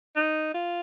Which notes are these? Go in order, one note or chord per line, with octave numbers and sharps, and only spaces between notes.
D#4
F4